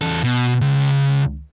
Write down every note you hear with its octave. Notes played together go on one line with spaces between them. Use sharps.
E2 A4
B2
C#2